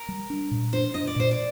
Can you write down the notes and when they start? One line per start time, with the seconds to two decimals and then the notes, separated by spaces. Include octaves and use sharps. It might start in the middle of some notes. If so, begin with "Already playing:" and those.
Already playing: A#4
0.09 G3
0.30 D4
0.51 A#2
0.73 D4 C5
0.94 D4 D#5
1.07 D5
1.16 A#2 C5
1.31 D5